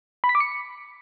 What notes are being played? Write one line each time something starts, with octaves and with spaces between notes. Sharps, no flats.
B5
B6
D6
C#7